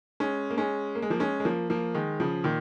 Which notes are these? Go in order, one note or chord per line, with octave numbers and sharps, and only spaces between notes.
G#3 C#4
A#3
G#3 C#4
A#3
G#3
F3 A#3
G#3 C#4
G#3
F3 A#3
F3 A#3
D#3 G#3
C#3 F3
A#2 D#3